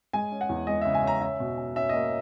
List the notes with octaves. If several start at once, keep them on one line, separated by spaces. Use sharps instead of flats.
G#3 G#5
C#4
F#5
E2
G#3 D#5
C#3 E5
G#5
C#4 A#5
C#4 E5
B2
C#4
C#4 E5
A#3 D#5